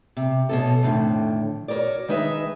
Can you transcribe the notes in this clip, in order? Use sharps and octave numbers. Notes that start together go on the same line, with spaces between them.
C3
B2 C#4 A4
F2 A2 D3 D#3
F#4 G4 A#4 C#5 D5
D#3 G#3 D#4 B4 E5